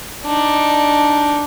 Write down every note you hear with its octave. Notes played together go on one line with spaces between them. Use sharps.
D4 D#4